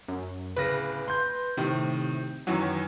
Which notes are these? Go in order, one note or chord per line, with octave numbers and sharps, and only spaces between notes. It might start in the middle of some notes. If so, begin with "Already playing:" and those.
F#2
D1 C#3 B4 A#6
C6 G6
A2 C3 D#3
F#2 D#3 E3 F#3